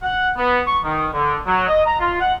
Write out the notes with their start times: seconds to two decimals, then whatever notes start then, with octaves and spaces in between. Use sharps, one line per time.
0.03 F#5
0.37 B3
0.67 C#6
0.84 D#3
1.14 D3
1.47 F#3
1.68 D#5
1.87 A#5
2.00 F4
2.21 F#5